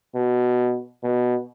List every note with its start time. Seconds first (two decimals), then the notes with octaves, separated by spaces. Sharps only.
0.15 B2
1.03 B2